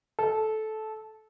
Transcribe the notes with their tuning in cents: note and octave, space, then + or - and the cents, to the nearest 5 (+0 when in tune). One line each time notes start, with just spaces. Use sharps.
A4 -15